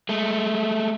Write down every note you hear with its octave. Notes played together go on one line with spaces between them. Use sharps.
G#3 A3